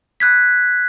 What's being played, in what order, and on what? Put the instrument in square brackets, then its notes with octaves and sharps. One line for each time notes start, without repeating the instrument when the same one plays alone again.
[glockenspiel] F#6 G#6 B6